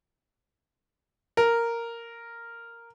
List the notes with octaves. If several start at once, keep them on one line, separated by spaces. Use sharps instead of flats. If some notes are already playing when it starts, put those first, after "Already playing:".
A#4